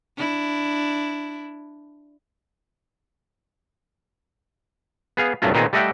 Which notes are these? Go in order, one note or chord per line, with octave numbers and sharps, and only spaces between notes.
D4 E4
B3 G#4 F5
C2 G2 C#3 F#3 A3 F4
A#2 D#3 B3 C4 D#4 G#4
G3 A3 D#5 E5 F#5 G5